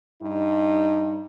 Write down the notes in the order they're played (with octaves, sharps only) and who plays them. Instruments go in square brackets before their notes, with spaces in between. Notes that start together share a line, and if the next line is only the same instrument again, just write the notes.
[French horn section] G2 D#4